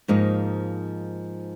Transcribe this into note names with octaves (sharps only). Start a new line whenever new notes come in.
G#2 F3 A#3 D#4